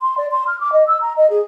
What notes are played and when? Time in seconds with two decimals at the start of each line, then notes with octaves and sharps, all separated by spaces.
0.02 C6
0.18 D5
0.31 C6
0.47 F6
0.60 D6
0.72 D#5
0.87 E6
1.01 A#5
1.17 D#5
1.30 G#4